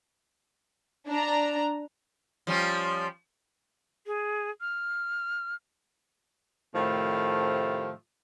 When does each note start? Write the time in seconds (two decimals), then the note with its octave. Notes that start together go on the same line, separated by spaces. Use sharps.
1.08 D4 A#5
2.47 F3 G3 C#4
4.07 G#4
4.61 F6
6.75 A2 C3 D#3 F3 A3